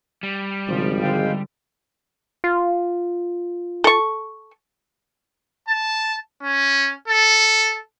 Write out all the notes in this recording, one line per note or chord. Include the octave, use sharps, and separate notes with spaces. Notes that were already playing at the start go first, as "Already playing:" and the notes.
G3
G#1 C#3 F3
D3 G#3 F5 G5
F4
A4 C#6
A5
C#4
A4